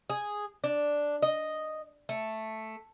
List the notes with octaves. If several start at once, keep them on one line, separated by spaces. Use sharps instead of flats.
G#4
D4
D#5
A3